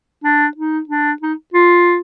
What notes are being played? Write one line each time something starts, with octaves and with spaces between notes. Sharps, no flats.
D4
D#4
D4
D#4
F4